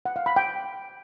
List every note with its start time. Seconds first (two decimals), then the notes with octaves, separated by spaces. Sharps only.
0.05 F#5
0.16 F5
0.26 B5
0.36 G5